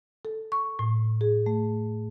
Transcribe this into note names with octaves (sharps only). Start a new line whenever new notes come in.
A4
C#6
A2
G#4
A3